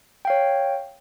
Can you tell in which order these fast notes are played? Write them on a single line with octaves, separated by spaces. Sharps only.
G5 F5 C#5